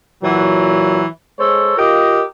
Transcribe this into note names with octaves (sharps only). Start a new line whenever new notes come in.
A#2 E3 F#3
G#3 A4 C5 C#5
F4 G4 A#4 D#5